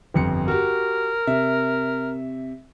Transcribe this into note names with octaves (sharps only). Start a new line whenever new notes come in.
G1 F2 C#7
F#4 G4 A#4
C3 E5